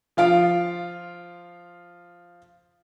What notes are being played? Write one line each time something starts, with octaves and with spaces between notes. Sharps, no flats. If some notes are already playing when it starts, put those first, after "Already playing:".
F3 F4 F5 D7